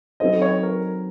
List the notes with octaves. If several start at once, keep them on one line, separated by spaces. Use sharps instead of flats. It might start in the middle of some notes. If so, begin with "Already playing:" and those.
F#3 C4 D#4 A4 C5 D#5
C#5
A#4